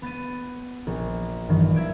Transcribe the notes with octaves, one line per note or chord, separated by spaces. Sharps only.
B3 A6 D#7
A#1
G2 D#3 E3 F#3
E5 G#6 D7